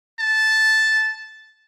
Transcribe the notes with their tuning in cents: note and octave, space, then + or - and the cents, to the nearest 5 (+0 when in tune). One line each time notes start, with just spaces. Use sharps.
A5 -5